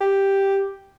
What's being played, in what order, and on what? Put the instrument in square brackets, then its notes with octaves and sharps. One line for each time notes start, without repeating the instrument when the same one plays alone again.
[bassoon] G4